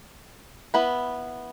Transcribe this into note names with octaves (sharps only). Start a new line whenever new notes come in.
B3 E4 B4